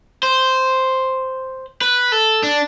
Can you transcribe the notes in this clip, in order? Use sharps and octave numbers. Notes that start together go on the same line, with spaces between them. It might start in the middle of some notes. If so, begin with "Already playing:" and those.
C5
B4
A4
D4